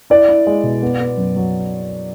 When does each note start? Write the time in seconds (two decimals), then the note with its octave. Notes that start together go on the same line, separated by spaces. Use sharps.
0.10 E4 D5
0.29 E4
0.47 G#3
0.64 B2
0.83 B3
1.00 B3
1.18 F#2
1.36 F#3